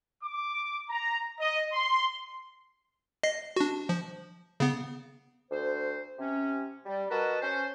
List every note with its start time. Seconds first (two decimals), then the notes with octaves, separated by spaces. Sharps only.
0.22 D6
0.89 A#5
1.39 D#5
1.73 C6
3.23 D#5 C7
3.56 D4 F#4
3.89 F3
4.60 C#3 B3
5.51 D2 C5
6.18 C3 C#4
6.86 G3
7.10 F#4 A#4 B4 D#5 A5
7.42 C#4 C5